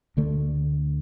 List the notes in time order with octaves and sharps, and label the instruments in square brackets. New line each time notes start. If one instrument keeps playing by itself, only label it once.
[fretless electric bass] D2 D3 A3